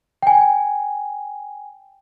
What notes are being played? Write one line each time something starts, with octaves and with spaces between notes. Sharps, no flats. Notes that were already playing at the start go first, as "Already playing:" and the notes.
G5 G#5